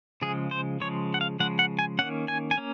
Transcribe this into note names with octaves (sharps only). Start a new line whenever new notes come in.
C#3 F3 G#3 G#4
C5
C#3 F3 G#3 C#5
F#5
F5
C#3 F3 G#3 F#5
F#5
G#5
D#3 A#3 C#4 F#5
G#5
G#5
A#3 C#4